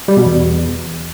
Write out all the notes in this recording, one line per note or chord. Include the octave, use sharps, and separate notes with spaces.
G3
B2
E2